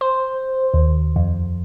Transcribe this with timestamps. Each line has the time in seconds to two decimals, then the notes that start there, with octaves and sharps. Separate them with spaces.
0.01 C5
0.74 D#2
1.16 F2